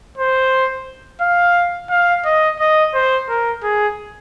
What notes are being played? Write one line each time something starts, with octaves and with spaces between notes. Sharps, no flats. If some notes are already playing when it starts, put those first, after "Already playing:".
C5
F5
F5
D#5
D#5
C5
A#4
G#4